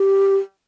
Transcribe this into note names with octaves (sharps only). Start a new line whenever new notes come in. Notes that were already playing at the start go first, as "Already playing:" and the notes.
Already playing: G4